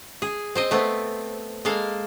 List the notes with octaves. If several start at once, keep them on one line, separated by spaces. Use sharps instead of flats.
G#4
C4 C5 D#5
A3 B3 C4
G#3 A#3 A4 F5